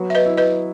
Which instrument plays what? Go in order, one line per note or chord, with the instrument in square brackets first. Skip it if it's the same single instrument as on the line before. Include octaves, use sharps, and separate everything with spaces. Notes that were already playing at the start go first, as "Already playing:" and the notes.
Already playing: [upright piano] F#3 B3
[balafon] E5
B4 D#5
[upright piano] E4
[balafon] B4 D#5